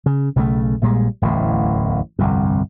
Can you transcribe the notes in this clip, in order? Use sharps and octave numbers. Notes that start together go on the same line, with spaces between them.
C#3
B1 C#3 E3 A3
A#1 A#2 G3 G#3
D1 A1 E2 A2
G1 C2 F2